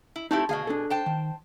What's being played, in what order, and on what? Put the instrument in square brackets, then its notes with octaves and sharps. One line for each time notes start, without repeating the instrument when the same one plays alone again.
[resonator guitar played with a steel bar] E4
[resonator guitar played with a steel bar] A3 C4 E4 [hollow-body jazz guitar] D#4 G4
[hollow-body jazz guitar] D2 F5 [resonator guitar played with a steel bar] B2 G#4
[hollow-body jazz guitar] D4 A4
[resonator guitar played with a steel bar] C5 G5 A5
[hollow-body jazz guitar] D#3